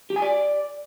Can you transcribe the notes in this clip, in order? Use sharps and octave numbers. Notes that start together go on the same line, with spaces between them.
G4
G#5
D5